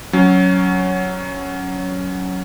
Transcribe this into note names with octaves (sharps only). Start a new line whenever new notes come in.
F#3 C#4